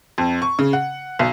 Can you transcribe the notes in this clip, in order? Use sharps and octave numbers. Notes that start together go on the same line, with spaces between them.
F2
C#6
C#3
F#5
B1